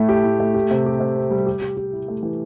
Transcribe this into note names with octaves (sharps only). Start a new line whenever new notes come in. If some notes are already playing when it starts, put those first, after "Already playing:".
Already playing: A2 A3 E4
G4
A2
A3
G4
C3
G4
C3
C4
G3
G4
G4
G4
E4
A3
E3